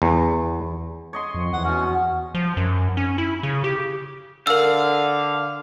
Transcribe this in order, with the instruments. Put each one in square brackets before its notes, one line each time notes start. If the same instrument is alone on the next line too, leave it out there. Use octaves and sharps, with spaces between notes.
[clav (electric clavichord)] E2
[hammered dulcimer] C#5 D#5 C6
[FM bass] F2
[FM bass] E2 [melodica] F#5
[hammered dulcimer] B2 F#4 [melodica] C#4
[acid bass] F3
F#2
C#4
E4
C#3
G4
[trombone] D3 [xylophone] A#4 E6 [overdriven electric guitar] F5